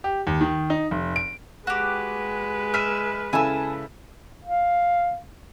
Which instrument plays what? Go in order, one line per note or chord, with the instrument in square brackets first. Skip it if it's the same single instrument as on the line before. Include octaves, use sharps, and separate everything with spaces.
[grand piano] G4
D#2
D#3
D#4
F1
D7
[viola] G#3 B4 [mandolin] F#4 G4
[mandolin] E5 [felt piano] F6 B6 D#7
[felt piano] C#3 E4 A4 [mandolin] G#5 A5 E6
[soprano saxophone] F5